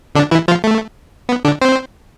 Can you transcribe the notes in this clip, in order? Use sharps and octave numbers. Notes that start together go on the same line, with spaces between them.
D3 D4
E3 E4
F3 F4
A3
B3
D3 D4
C4 C5